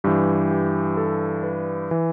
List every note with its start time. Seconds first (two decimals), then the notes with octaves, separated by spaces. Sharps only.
0.04 G2 E3 G4
0.51 G4
0.97 A4
1.43 B4
1.91 E3